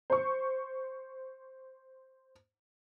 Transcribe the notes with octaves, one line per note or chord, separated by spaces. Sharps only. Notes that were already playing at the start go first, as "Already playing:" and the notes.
C5 C#6